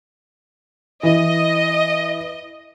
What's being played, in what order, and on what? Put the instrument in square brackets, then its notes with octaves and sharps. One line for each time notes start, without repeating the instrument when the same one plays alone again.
[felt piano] E3 [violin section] D#5